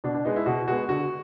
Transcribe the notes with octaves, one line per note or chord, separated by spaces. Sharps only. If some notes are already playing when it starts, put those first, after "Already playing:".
B2 D4
D4
G#3 B3 D#4
E4
B2 F#4
G#3 B3 F#4
D3 F#4